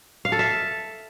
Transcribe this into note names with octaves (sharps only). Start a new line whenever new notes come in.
F5
A4
E5